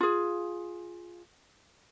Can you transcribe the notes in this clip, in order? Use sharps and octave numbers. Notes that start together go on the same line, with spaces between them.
F4 G#4